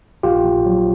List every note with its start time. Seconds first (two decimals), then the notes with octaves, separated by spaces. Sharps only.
0.23 A#1 F4 G4
0.44 A#1
0.66 F#3